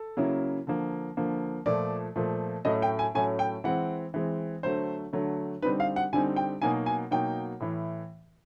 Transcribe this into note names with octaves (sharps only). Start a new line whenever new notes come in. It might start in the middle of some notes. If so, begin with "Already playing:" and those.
Already playing: A4
C#3 F#3 A#3 C#4 E4
D3 F3 A#3
D3 F3 A#3
A#2 F3 A3 D5
A#2 F3 A3
A2 F#3 A3 C#4 D#5
G5
G#5
A2 F#3 A3 C#4 G#5
G5
E3 G#3 C4 F#5
E3 G#3 C4
D3 F#3 A3 C5
D3 F#3 A3
D3 G3 C4 D#4 B4
F5
F#5
D3 G3 C4 D#4 G#5
G5
B2 F#3 A#3 D#4 G#5
G#5
B2 F#3 A#3 D#4 G5
A2 E3